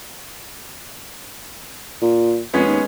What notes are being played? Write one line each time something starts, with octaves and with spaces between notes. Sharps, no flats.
A#2
F2 G#3 B3 C#4
D#2